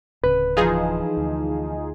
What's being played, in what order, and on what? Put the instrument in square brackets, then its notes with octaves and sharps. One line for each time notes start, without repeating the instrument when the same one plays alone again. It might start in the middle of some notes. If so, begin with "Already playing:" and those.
[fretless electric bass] D1 C#3 [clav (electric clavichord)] B4
[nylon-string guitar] E3 F3 [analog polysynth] D#4 F4 G#4
[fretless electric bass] D2